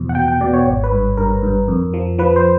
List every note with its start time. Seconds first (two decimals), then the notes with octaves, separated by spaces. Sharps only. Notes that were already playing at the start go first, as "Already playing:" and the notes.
Already playing: E2 B2 F3
0.09 F#5
0.15 B2 G5
0.28 G5
0.41 B2 D5
0.54 C#5
0.66 G#1 C#5
0.84 B4
0.92 G2
1.17 G2 A#4
1.43 G2
1.68 F2
1.93 F3
2.18 F3 B4
2.36 C5